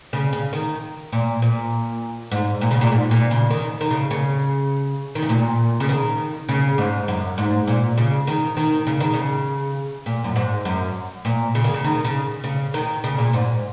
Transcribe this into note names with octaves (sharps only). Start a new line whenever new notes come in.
C#3
C#3
D#3
A#2
A#2
G#2
A#2
C#3
A#2
G#2
A#2
C#3
D#3
D#3
C#3
C#3
D#3
C#3
A#2
C#3
D#3
C#3
G#2
F#2
G#2
A#2
C#3
D#3
D#3
C#3
D#3
C#3
A#2
F#2
G#2
F#2
A#2
C#3
D#3
C#3
D#3
C#3
C#3
D#3
C#3
A#2
G#2